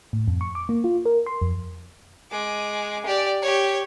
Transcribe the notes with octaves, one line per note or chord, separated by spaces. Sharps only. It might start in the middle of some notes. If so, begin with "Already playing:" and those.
A2
F2
C#6
D6
A#3
F4
A#4
C6
F2
G#3 D6
G4 D5
G4 C#5